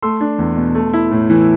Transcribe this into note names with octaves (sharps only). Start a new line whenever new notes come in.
A3 C6 E6
D4
E2
B2
A3
E4
A2
E3